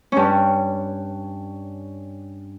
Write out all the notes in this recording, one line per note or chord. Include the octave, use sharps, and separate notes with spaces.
G2 C#4